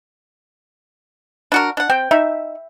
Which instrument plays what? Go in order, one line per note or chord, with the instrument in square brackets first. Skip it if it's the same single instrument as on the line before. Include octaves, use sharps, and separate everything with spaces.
[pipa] D4 F#4 A#4
D4 F#5
[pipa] C4 [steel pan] G5
[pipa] D#4 [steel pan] E5